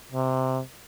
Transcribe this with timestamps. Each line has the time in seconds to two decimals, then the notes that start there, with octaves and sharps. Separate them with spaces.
0.12 C3